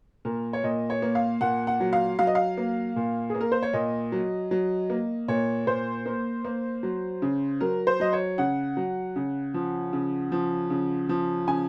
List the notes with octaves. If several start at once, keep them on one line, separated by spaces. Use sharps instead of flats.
A#2 A#4
C#5
A#2 D#5
C#5
A#3
F5
A#2 F#5
F#5
F#3
F5
F#3 F5
D#5
F5
A#3
A#2
A#3 G#4
A#4
C5
C#5
A#2 D#5
F#3
F#3
A#3
A#2 C#5
A#2 C5
A#3
A#3
F#3
C#3
F#3 A#4
C5
F#3 D#5
C#5
C#3 F#5
F#3
C#3
F3
C#3
F3
C#3
F3
C#3 G#5